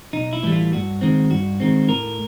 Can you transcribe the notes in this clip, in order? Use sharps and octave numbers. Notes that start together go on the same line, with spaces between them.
B1 D#4
E4
A2 E3 G3
F4
G2 F#4
D#3 G#3 C4
G2 F#4
D#3 G#3 C4
A2 A#4